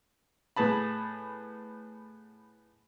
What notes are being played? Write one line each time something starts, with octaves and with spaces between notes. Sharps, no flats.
A2 B3 G#4 A5 B5